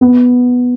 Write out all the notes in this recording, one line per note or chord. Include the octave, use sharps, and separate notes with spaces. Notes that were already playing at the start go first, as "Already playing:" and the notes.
B3